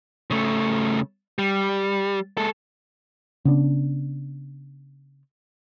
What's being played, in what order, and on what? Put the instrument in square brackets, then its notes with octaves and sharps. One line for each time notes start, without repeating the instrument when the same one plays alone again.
[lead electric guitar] C#3 A3
G3
G#3 A4
[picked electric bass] C#3 B3 D4